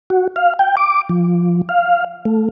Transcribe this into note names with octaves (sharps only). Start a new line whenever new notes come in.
F#4
F5
G5
D6
F3
F5
A3